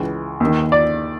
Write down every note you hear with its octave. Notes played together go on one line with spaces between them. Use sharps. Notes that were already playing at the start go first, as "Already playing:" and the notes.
Already playing: C#2 C#3 E3
D#2 D#3
D5